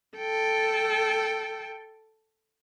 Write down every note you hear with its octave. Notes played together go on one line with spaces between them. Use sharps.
A4 G5